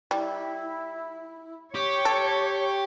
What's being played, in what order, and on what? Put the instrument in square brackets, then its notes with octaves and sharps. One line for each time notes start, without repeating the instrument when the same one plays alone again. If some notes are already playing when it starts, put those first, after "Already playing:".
[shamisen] G3 [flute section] E4
[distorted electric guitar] G4 [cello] C#5 [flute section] C#6
[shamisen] A4